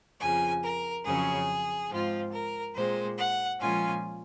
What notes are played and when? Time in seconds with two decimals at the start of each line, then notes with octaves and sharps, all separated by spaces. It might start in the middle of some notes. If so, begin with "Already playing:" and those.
0.20 F2 C#3 F3 G#5
0.63 A#4
1.04 F2 C#3 F#3 C#4 G#4
1.90 G#2 F3 C4 F4
2.32 A#4
2.75 A#2 G#3 C4 C5
3.18 F#5
3.59 A#2 F3 G#3 C#4 F4 G#5